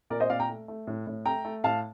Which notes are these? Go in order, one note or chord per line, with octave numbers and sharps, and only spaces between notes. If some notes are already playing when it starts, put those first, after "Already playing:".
A#2 A#4 D5
C5 D#5
A#2 D5 F5
G5 A#5
A3
A3
A2
A2
A3 G5 A#5
A3
A2 F5 A5